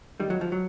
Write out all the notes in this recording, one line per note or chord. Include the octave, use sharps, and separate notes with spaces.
D#3 G3
F2 F#3
F3
F#3